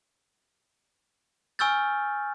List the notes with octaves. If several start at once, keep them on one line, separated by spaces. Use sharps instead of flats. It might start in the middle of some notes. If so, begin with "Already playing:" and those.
G#5 C#6 E6 F6 G6 A6